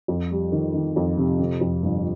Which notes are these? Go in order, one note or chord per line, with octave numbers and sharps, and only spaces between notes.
F2
G3
D#3
D#3
F2
C3
C3
F2
G1